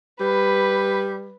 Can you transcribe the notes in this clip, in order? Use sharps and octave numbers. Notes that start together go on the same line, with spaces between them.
G3 B4